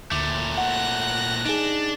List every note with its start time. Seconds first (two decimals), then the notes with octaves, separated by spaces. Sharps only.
0.11 D2 A#2 A3 D6
0.58 F#5 F#6 A#6
1.45 D4 D#4 G#4